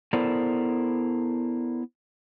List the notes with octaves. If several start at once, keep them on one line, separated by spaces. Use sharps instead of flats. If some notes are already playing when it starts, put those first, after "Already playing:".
B3 E4 A4 A#4 C5 D5